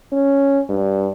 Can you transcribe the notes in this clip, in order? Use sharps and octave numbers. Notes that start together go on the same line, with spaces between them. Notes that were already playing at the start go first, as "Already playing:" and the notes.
C#4
G2